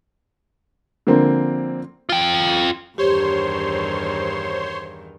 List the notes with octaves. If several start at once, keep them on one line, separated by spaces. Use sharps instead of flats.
D3 F3 A#3 C4
F4 G5
E2 G2 D#3 G4 C5 C#5 C6